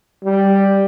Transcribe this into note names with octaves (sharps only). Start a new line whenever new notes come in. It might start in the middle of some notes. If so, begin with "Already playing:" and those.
G3